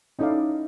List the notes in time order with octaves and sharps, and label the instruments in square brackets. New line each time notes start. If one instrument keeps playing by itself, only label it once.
[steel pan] C#4 E4 A4 D5 F5 [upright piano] D#4